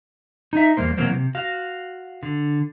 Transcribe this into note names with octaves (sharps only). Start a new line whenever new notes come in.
D#4 E5
E2 G#2 G3 A#3 C5
B2 E3 F#3 A#3 C4
C3
F#4 F5
D3